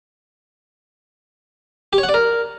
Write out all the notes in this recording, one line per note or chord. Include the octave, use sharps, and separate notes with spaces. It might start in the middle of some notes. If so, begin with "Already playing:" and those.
G4
C#5
F#5
D5
A#4